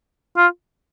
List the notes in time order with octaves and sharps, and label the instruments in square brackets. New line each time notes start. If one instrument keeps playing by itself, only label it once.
[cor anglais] F4